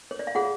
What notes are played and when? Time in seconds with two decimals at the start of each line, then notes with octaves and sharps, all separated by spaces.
0.11 C#5
0.19 D5
0.27 F5
0.35 F4 G#4 C#5 F#5